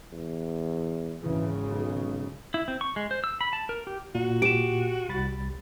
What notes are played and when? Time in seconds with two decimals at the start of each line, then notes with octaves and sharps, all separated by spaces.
0.13 E2
1.23 G#1 C#3 E3
1.71 B1
2.54 E4
2.68 C4
2.81 C#6
2.96 G#3
3.11 C5
3.24 E6
3.41 B5
3.53 A5
3.69 A#4
3.87 G4
4.15 A#2 F#4
4.42 G4 D7 E7
5.09 C2 B5 A6